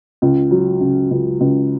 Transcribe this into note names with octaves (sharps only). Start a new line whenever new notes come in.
C#2
F#3
C#3
C#2
C#2